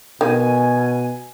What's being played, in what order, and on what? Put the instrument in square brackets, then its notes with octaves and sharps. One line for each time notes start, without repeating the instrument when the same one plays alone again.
[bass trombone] B2 [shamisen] D#3 [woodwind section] G#5